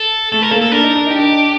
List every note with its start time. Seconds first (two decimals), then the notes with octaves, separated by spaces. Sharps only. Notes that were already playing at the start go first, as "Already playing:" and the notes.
Already playing: A4
0.32 A3 A4
0.42 A#4
0.51 A#3 A4
0.62 A4
0.72 D4 A#4
0.84 D#4
0.95 D4
1.07 D#4 G4
1.19 D4